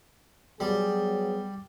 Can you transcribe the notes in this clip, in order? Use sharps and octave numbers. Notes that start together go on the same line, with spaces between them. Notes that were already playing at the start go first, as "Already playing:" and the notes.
F#3 G3 B3 G#4